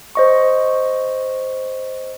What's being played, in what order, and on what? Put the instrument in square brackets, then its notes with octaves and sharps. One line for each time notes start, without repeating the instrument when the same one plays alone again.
[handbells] C5 D#5 C#6